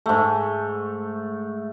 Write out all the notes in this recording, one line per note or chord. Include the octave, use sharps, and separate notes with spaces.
G#2 A3